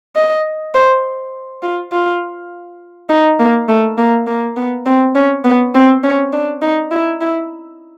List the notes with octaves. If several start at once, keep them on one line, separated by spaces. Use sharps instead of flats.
D#5
C5
F4
F4
D#4
A#3
A3
A#3
A#3
B3
C4
C#4
B3
C4
C#4
D4
D#4
E4
E4